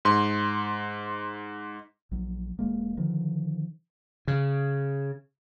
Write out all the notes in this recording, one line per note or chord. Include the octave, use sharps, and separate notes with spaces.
G#2 C6
A#1 F#3
E1 G#3 A#3
D3 D#3 F3
C#3